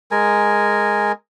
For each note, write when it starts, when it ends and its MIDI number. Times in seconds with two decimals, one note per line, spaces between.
0.11 1.12 56
0.11 1.12 70
0.11 1.12 80